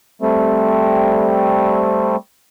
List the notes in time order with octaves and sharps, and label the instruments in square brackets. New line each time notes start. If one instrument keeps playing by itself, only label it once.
[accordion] G3 A3 C4